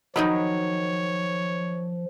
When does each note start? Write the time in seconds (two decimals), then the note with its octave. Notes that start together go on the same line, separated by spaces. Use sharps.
0.16 D#3 F3 F#3 D#4 C#5 D#5 B5